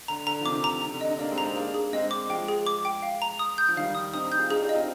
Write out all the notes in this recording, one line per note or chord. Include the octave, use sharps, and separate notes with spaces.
D3 A#5
D3 A#5
F3
C3 D#3 D6
A#5
C3 A#5
D3
D#5
D#4
A#3 D4 D#5
G#3 C4
D4 A#5
C4 D#4
A#3 D4 G#4
G#4
G#3 C4 D#5
D6
F3 G#3 G5
G#4
D6
G5
F5
A#5
D#6
G6
F3
D#3 G3 F5
D#6
C4 D#4 D#6
D#4 G4
G6
F4 G#4
D#4 G4 G#4
D4 F4
D#5
C4 D#4